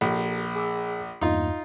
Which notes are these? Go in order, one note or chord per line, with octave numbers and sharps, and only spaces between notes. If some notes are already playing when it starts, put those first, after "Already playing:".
A#1 G4 A4
G#4 D6 E6
E2 G2 A#3 D#4 F4